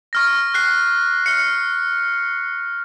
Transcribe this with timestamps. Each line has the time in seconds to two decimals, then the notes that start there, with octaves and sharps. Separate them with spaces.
0.13 C#6 F6 A#6
0.54 F#6 C7
1.26 F6 C#7